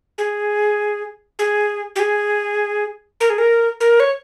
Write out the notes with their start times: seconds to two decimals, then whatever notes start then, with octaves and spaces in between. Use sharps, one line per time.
0.18 G#4
1.39 G#4
1.96 G4
2.00 G#4
3.21 A#4
3.30 G#4
3.38 A#4
3.80 A#4
4.00 C#5